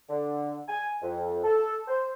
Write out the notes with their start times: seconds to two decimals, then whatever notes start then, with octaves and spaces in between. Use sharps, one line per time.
0.09 D3
0.68 G#5
1.02 F2
1.44 A4
1.88 C5